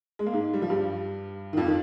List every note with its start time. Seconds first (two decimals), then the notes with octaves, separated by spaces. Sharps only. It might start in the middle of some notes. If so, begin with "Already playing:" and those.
0.19 G#3
0.26 A#3
0.33 G#2 G#3
0.53 G3
0.62 F3
0.70 G2 G3
1.53 D#3
1.57 F2 F3
1.67 D#3